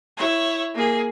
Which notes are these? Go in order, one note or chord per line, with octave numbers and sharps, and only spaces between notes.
E4 C#5
A#3 G#4